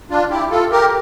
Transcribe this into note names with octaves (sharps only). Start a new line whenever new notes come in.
D4 F4
E4 G4
F4 A4
G4 A#4